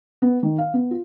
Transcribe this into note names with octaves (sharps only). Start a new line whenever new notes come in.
B3
D#3
F5
B3
F4